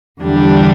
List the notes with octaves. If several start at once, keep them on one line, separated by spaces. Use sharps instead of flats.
E2 D3 G3 D4 G4